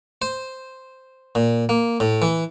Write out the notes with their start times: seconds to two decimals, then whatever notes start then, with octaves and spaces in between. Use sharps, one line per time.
0.22 C5
1.35 A#2
1.69 A#3
2.00 A2
2.22 E3